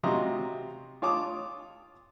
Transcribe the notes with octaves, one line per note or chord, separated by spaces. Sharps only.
C3 F#3 F4 D#5 A#5
F4 C#5 A5 D6 D#6